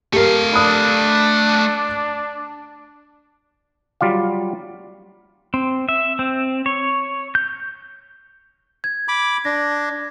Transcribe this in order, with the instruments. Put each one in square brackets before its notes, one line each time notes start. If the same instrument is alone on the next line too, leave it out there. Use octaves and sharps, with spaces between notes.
[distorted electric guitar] A3 F5 [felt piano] G4 A#4
[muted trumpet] D4 [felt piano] B5 D#6 [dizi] F#6
[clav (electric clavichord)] F#3 G3 F4 D5 F5
[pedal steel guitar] C4
E5
C4
C#5
G6
[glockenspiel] G#6
[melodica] B5 D6
[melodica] D4 [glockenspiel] A#6